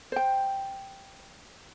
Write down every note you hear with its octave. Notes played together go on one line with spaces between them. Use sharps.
C5 G5